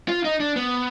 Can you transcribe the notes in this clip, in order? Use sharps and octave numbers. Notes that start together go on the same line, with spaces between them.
F4
D#4
D4
B3